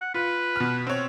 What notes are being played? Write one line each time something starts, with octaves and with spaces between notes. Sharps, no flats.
F#5
F4 B4
B2 F6
C4 C#5